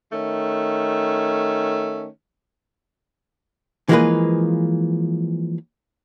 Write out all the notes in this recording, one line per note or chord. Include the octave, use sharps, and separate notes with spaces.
D#3 A3 C#4
E3 F3 G#3 A#3 G#4 B4